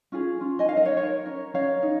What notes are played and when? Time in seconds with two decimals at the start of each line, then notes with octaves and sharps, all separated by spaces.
0.12 C#4 F4 G#4
0.40 C#4 F4
0.59 D#5 G#5
0.69 D#4 A#4 F5
0.77 D#5
0.85 C#5 F5
0.97 D#4 A#4 C#5
1.26 C#4 A#4
1.54 C#4 A#4 C#5 F5
1.83 D#4